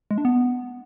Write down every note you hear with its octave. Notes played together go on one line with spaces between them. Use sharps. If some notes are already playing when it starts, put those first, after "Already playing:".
G#3
D4
B3